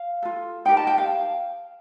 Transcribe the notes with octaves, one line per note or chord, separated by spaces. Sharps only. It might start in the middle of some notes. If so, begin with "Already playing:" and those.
Already playing: F5
F4 A4
D#4 G4 A#4 G5
A5
G5
F5